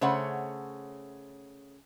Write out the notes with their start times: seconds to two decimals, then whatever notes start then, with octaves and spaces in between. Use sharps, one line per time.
0.01 C#3 A3 C5 C#5 F#5